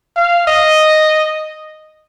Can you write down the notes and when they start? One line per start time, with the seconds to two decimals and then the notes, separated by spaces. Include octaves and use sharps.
0.16 F5
0.47 D#5